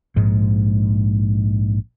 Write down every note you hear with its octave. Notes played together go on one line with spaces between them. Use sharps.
A#1 G#2 G#3